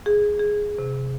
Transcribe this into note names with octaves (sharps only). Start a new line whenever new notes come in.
G#4
G#4
C3